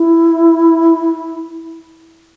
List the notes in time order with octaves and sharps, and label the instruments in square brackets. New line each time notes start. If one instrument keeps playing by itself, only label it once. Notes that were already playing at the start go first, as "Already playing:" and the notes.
Already playing: [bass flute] E4